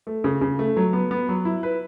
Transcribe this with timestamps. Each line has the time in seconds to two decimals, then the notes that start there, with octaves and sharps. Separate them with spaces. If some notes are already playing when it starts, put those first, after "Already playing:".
0.07 A3
0.24 C#3
0.41 C#3
0.59 A3
0.77 F#3
0.93 B3
1.11 B3
1.29 F#3
1.45 E4
1.63 B4